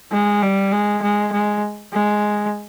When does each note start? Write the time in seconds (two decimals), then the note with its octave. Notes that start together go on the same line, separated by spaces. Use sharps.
0.12 G#3
0.42 G3
0.72 G#3
1.02 G#3
1.32 G#3
1.93 G#3